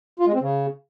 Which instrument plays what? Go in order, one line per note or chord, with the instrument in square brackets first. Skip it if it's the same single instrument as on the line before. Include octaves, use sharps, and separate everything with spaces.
[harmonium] F4
G#3
C4
C#3